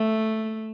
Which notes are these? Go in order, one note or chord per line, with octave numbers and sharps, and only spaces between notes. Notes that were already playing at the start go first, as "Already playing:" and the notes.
Already playing: A3